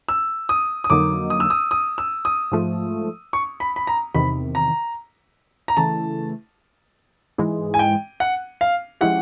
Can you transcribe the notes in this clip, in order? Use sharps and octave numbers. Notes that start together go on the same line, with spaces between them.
E6
D#6
D#6
F2 D3 F#3 A#3 D#4 D6
D#6
E6
D#6
D#6
E6
D#6
G#2 F3 A3
C#6
B5
B5
A#5
E2 C3 D#3 B5
A#5
A#5
C#3 E3 A3 A5
G#2 E3 G#3
G#5
G5
F#5
F5
F3 G#3 C#4 E4 G4 F#5